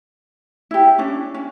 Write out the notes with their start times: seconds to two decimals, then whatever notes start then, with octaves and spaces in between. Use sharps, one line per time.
0.71 E4 G4
0.98 C#4 D4
1.34 C#4